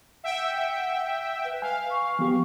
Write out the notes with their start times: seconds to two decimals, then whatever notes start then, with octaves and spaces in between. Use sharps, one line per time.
0.24 E5 F#5 G5
1.44 B4
1.62 F5 G#5
1.90 C#6
2.19 F3 B3 G4